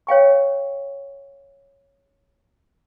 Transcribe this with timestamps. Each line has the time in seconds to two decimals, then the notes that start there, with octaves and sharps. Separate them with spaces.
0.07 C#5 F5 G5 C#6